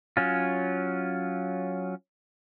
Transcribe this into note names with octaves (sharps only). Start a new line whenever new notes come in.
F#3 C#4 F4